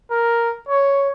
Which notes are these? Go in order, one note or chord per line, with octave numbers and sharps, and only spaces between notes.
A#4
C#5